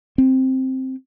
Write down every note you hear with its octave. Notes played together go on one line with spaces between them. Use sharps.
C4